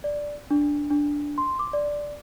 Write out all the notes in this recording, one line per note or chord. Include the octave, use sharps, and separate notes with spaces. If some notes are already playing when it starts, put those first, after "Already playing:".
D5
D4
D4
C6
D6
D5